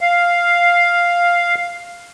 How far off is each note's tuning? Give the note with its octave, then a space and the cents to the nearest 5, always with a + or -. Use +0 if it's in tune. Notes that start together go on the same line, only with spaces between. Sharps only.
F5 +0